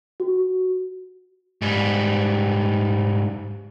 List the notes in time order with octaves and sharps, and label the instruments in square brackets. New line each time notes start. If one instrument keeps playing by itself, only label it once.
[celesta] F#4
[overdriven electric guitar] G#2 G3